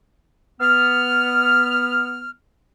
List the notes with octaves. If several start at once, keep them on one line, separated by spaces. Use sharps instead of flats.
B3 F6